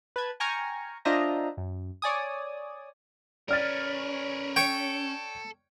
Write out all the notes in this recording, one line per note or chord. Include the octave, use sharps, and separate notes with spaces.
B4 A5 G#6
G5 G#5 A#5 C#6 F6
D4 F4 C5 D#5 E5 A#5
F#2
C#5 D5 G#5 D#6
C#4 A#4 B4 D5 F6 A6
A4 C#5 G5